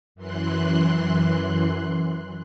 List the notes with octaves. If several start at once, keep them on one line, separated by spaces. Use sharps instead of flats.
F#2 E3 C6 F#6